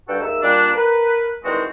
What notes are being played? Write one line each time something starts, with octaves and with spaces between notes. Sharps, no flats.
D2 G2 D3 F#4 A4 G5
D#2 G#3 A#4 E5 E6
A#2 G3 D4
A#4 B4
D#3 E3 G3 G#3 C4 F#4